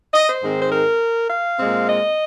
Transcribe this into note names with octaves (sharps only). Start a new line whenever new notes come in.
D#5
C5
G#2 D#3 G#3 C4
C5
A#4
F5
A#2 G#3 C4
D#5